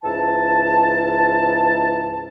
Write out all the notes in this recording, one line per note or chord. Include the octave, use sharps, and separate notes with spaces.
C#2 G#2 E3 A5